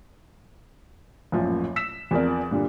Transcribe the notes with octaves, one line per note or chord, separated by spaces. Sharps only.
A1 F#2 A#2 F3
E6 B6 E7
E2 F3 C4 A#4 D5
G2 A#2 D3